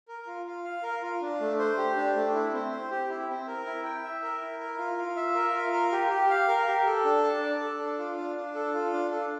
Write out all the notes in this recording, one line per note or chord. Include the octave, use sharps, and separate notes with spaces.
A#4
F4
F4
F5
A#4
F4
D4
A3
C5
G4
D4
A3
E4
C4
C5
G4
E4
C4
A#4
E4
G5
E5
A#4
E4
A#4
F4
F4
E5
A#4
F4
A#4
G4
G4
F5
A#4
G4
A4
D4
A5
D5
A4
D4
F4
D4
D4
A4
F4
D4
A4